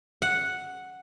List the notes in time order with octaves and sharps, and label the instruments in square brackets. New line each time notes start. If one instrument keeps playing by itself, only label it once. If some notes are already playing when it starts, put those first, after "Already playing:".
[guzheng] F#5